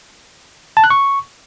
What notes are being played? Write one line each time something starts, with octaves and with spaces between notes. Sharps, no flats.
A5
F#6
C#6